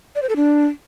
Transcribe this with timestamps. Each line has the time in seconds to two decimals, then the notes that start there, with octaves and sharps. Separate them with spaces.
0.15 D5
0.22 C5
0.29 A4
0.36 D4